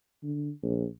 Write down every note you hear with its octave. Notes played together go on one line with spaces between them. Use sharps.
D3
A#1